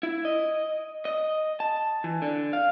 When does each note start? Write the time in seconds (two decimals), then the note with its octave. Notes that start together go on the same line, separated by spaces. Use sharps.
0.03 E4
0.25 D#5
1.05 D#5
1.60 A5
2.04 E3
2.22 D3
2.53 F5